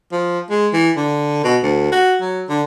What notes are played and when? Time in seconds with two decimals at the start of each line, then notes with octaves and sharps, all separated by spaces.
0.12 F3
0.50 G#3
0.73 E3
0.96 D3
1.44 B2
1.63 D2
1.92 F#4
2.21 F#3
2.49 D3